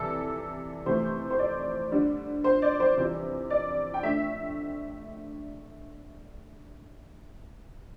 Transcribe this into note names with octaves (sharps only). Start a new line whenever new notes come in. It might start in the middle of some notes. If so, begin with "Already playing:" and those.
Already playing: C3 E3 G3 A4
C3 E3 A3 C5
C5
D5
D3 G3
C5
D5
C5
C3 E3 G3
D5
G5
D3 A3 E5